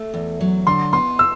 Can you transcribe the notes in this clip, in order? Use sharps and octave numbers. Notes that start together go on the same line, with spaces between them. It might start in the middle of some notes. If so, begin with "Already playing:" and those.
Already playing: A3
E2
F#3
D3 C6
B3 C6
E6